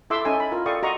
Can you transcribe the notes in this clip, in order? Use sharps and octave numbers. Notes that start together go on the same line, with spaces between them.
E4 A4 E5 C6 D6 E6
C#4 D#4 E4 A4 G#5
B5
E4 F4 A#4
A4 D5 F5 G5 C#6 D#6
F#4 D#5 A#5 C6 C#6